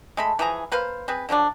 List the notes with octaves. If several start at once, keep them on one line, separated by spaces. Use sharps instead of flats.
G#3 A3 B5
E3 F3 G#4 A#5
A#3 B4 C5 F5
C4 G#4 B4
D3 F3 F#3 D4